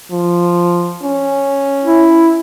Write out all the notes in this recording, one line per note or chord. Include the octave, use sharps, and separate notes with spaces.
F3
C#4
E4